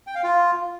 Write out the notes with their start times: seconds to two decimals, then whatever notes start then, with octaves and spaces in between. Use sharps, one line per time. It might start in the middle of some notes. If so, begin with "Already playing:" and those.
0.07 G5
0.15 F5
0.23 F4